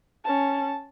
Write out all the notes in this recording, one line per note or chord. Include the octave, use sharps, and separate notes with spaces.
C#4 A5